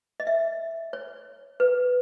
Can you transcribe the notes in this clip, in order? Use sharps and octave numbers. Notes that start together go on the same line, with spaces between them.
D#5
E5
C#5
B4